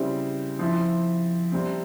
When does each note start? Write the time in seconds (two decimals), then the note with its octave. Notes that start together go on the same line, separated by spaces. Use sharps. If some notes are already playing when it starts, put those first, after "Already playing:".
Already playing: C#3 G3 C4 E4
0.59 F3 C4 E4
1.52 C3 G3 C4